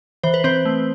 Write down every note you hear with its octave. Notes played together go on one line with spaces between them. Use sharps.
E3 C5
B4
E3 C4 C5
A3